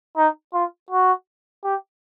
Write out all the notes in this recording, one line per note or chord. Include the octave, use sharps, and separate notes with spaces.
D#4
F4
F#4
G4